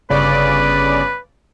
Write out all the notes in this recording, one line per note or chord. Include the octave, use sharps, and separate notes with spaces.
G1 C#3 B4 D5